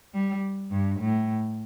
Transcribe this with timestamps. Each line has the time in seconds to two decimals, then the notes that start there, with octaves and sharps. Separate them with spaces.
0.14 G3
0.71 G2
1.00 A2